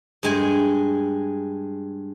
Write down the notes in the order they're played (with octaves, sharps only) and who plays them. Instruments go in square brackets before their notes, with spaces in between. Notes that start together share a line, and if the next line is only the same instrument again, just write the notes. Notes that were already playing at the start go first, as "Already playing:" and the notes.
[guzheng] G2 G#3 G#5